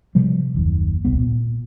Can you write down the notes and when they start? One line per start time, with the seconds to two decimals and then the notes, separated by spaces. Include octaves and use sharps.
0.15 C3 F3 G3
0.55 F#1 D#2
1.05 D#1 C2 B3
1.19 A#2